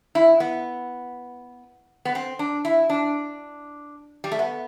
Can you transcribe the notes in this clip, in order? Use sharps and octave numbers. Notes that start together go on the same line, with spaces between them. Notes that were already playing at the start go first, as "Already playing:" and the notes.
E4
B3
B3
C4
D4
E4
D4
G3
A3
B3